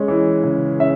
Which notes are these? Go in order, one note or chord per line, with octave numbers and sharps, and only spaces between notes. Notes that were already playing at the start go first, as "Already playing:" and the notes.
Already playing: G#3 C#4
E3
C#3
C#4 E5